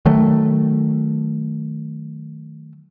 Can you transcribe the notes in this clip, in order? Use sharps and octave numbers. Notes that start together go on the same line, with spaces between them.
D#3 F#3 A3